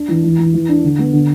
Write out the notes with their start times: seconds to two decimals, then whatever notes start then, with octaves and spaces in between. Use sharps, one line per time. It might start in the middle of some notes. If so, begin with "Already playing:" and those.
Already playing: D4
0.08 E3
0.24 E3
0.38 E3
0.54 E3
0.69 D4
0.84 D3
0.99 B3
1.13 D3